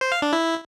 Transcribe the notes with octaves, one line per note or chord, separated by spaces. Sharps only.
C5
F5
D4
E4